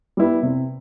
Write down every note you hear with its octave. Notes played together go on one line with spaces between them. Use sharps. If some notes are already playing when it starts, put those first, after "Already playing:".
G3 B3 E4
C3